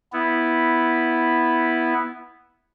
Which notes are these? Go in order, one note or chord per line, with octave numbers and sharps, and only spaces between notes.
B3 E4